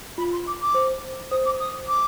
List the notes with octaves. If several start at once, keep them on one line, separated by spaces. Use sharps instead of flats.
F4 B5
C6
D6
D6
C5
C5 D#6
D6
D#6
D6